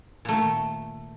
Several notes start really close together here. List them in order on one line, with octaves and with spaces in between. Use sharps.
A#2 A3 D#3